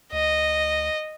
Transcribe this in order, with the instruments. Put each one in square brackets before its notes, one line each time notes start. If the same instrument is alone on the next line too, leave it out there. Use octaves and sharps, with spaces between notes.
[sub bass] D2 [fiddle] D#5